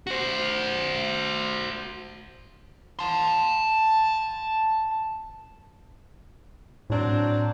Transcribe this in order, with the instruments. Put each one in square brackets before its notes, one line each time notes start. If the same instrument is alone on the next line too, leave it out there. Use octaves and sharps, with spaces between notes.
[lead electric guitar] F#4 C5
A5 C6
[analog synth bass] A2 [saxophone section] F#3 C4 D4